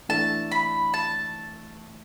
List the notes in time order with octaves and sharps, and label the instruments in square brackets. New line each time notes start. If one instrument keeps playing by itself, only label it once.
[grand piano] E3 A3 D4 [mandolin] A5
[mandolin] B5
A5